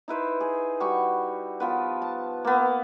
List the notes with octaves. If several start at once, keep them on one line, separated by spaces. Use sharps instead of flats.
D#4 E4 B4 C5
G#4
G3 F#4 B5 C#6
F3 B3 B4
A5
A#3 B3